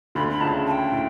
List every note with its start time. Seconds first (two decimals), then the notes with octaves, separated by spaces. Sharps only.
0.15 D2 D3 B5
0.30 B5
0.41 C#2 C#3 A5
0.67 A5
0.71 G5
0.92 A2